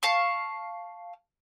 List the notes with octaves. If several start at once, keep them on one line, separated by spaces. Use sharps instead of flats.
F5 A5 C#6